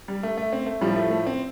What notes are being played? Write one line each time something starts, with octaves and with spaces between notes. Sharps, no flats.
G3
A3
A3
C4
A3
A2 F3 G3
A3
A3
C4